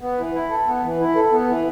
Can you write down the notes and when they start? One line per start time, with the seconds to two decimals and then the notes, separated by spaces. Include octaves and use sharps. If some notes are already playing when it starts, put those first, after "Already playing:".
0.01 B3
0.18 E3
0.35 E4
0.50 A4
0.67 B3
0.84 E3
1.00 E4
1.15 A4
1.32 B3
1.48 E3